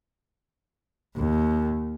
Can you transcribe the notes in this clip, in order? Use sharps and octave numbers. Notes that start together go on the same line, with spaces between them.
D#2